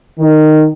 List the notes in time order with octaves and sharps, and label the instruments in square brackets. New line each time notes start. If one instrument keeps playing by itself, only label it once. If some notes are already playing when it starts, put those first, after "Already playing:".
[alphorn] D#3